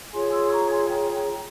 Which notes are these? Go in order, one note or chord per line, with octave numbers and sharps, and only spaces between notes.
F4 G#4 C#5 G#5 C6
C6 E6
A#5 C#6
G#5 C6
G5 A#5
G5 A#5